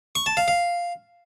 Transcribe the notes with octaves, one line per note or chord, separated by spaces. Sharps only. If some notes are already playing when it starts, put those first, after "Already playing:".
C#6
A5
F5
F5